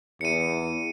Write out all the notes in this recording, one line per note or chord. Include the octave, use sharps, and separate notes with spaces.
E2 C#7 D#7